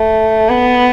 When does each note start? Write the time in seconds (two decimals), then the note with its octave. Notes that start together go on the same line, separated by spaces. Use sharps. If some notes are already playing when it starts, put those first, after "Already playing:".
Already playing: A3
0.49 B3